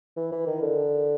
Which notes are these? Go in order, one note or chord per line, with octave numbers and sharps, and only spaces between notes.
E3
E3
D#3
D3